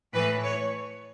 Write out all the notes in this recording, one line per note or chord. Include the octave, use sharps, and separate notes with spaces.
A2 E3 B4
C#5